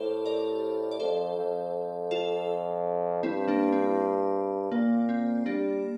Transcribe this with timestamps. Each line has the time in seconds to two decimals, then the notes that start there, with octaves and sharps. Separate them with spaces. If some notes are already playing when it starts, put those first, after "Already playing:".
Already playing: A2 G4 A4 A#4 C5
0.25 A#4 D5
0.91 D5
0.99 F2 A4 C5
1.37 F2
2.11 F4 A4
3.23 G2 C4 E4
3.48 A#3 D4
3.72 C4
4.71 A#2 A#3
5.09 C4
5.46 G3 A#3 D4